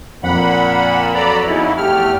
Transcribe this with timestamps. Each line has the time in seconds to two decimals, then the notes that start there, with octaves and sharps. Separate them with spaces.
0.24 F2 A#2 F#5 B5
1.14 F#3 A4 B4 D5 A#5 B5
1.47 E2 C#3 D#4 E4 F#4
1.77 E2 A3 G4 F6